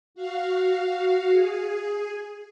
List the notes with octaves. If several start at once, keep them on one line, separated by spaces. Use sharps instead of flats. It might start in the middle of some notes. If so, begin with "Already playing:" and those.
F#4 F5
G#4